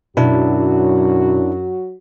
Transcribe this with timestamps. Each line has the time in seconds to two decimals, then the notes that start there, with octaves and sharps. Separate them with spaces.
0.17 F#2 B2 F#3 D4 E4 F#4